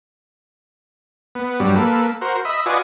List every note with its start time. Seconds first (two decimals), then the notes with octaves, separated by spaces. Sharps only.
1.35 B3
1.60 G2 F#3 G3
1.76 A#3 A4 B4
2.21 F#4 A#4 C5
2.45 D#5 E5 B5
2.66 F4 F#4 B4 D5 D#5 G#5